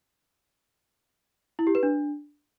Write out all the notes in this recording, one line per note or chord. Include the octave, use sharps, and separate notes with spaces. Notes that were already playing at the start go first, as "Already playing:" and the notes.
E4
G4
B4
D4